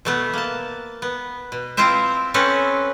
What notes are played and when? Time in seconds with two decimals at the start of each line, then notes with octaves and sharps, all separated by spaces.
0.05 B2 A3 B3
0.33 A#3 A5
1.02 B3
1.52 B2
1.77 C4 E4 F4 C5 E5
2.34 C4 C#4 A4 B4 C#5